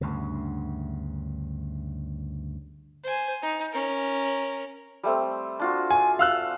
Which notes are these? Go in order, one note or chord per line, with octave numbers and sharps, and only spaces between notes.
D2 G2 C#3
C5 G#5
D#4
C#4 A#4
G3 A3 C4
D4 F4 F#4
G#5
F5 E6 F#6